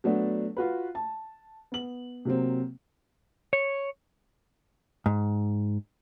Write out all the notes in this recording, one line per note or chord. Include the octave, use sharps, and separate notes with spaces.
F#3 A3 B3 D4
F4 F#4 B4
A5
B3 F#7
C3 F#3 A#3 C4
C#5
G#2